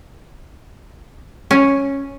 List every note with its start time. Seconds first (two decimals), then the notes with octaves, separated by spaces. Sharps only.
1.51 C#4